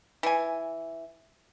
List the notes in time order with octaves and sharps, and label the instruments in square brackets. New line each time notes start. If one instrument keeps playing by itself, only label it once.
[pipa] E3 G#5